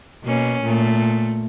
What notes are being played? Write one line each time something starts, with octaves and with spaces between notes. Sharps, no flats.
B2 A#3 C#4
A#2 A3